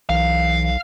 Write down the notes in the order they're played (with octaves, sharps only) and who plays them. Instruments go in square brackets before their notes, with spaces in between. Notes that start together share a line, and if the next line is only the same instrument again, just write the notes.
[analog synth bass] B1 [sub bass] E3 [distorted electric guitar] F5